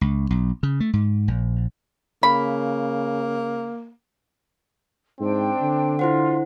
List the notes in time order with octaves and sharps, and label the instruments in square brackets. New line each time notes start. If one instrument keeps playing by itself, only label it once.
[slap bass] C#2
B1
C#3
A3
G#2
A#1
[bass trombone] C#3 [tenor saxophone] A#3 [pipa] B5
[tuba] G#2 [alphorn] C4 [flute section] D4 G5
[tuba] D3
[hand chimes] E4 C5 F#5 [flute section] F4